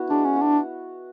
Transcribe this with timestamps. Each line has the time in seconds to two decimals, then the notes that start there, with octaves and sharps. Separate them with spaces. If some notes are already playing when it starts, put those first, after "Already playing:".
Already playing: B3 E4 F#4
0.10 G#3 D4
0.25 C#4
0.33 B3 F#4
0.42 D4